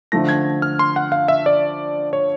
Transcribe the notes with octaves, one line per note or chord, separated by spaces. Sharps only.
D3 F3 A3 A#6
G#6
F6
C6
F#5
F5
E5
D5
C#5